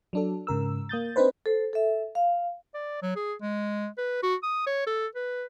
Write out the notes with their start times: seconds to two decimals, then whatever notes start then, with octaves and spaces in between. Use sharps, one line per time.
0.13 F#3 D4 A4
0.47 G#2 C#3 A#4 E6
0.89 A#3 D#6 G6 A6
1.16 C4 D4 D#4 B4 C5
1.46 A4 C5
1.73 A4 E5
2.15 F5
2.74 D5
3.02 F#3
3.16 G#4
3.41 G#3
3.98 B4
4.23 F#4
4.43 D#6
4.67 C#5
4.87 A4
5.15 B4